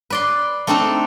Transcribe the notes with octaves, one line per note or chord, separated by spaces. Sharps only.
B4 D5 C6
A3 C4 D4 D#4 A4